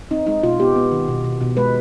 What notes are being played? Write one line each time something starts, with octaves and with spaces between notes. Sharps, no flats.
C4 D#4
G#3 D#4
B2 F4
B3 G4
B3
D#3
B2
B2
B2
G#3 B4